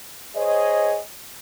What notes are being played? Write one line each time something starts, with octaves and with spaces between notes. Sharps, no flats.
G#4 C5 C#5 D#5